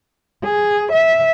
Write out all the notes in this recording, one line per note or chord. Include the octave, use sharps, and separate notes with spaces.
G#4
E5